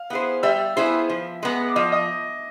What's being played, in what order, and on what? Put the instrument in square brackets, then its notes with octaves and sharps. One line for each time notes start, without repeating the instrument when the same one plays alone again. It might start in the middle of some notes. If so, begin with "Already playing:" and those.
Already playing: [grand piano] F5
[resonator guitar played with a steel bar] B3 E4 G#4 C5
[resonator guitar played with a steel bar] G3 [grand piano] E5 E6
[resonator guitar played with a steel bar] B3 E4 G#4 C5
F3
G#3 B3
[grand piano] D6
[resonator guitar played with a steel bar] F3 [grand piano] D#5 D#6
[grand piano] D#5 D#6